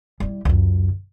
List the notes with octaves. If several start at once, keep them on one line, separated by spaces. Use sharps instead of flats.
G3 E4
C#2 F#2